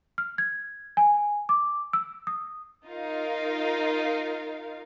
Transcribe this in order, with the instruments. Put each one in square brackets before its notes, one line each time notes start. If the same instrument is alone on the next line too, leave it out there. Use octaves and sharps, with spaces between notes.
[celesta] F6
G#6
G#5
D6
E6
D#6
[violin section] D#4 F4 A#4 F5